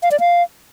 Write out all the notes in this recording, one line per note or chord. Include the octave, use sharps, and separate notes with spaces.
F5
D5
F5